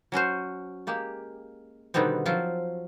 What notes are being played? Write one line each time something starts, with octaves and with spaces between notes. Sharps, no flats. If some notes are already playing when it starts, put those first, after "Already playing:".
F#3 C#4 F#4 C5
G#3 A#3 G4
B2 D3 D#3 G3 B3 C4
F3 F#3 C4 F4